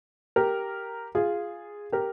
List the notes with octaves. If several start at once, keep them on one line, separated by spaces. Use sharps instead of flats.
G4 A#4
F4 G#4
G4 A#4